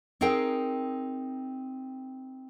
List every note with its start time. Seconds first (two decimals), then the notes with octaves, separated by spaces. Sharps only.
0.21 C4 D#4 G#4 A#4 G5